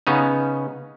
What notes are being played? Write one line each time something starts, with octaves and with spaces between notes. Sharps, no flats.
C#3 B3 C#4 D#4